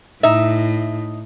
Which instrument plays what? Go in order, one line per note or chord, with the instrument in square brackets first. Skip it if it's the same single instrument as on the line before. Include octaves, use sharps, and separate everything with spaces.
[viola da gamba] A2 [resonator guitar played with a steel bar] D#4 E5